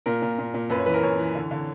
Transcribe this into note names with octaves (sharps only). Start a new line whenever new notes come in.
A#2 A#4
A#2
A#2
A#2
F#2 B4
C#5
E3 B4
A#4
F#2 C#5
E3
D3
D3